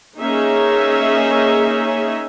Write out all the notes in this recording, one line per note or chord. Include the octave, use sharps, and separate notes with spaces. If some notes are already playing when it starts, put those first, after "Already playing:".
A#3 C#4 D#4 G#4 E5